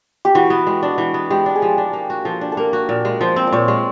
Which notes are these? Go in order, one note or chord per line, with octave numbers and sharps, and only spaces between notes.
G4
E3 F#4
B3
G#3
D4
E3
B3
G#3 G4
D4
G#4
F3 G4
D4
A#3
F#4
F3 A4
D4
A4
A#3 A#4
F#4
A#2
G#3
F3 C5
C4
D5
A#2 C#5
G#3